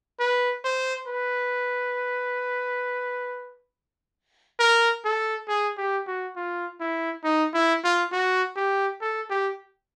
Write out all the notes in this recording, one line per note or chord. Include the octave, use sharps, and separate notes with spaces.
B4
C5
B4
A#4
A4
G#4
G4
F#4
F4
E4
D#4
E4
F4
F#4
G4
A4
G4